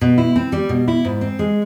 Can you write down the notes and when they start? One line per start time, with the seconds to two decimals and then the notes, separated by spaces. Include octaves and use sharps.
0.01 B2
0.18 E4
0.36 C4
0.52 G3
0.69 B2
0.88 E4
1.05 G#2
1.21 C4
1.39 G#3